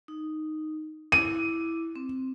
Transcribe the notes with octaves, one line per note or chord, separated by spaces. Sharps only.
D#4
E4 D6 D#7
C4